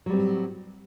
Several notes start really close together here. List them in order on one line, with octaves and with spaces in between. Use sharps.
F#3 G3 C4 A2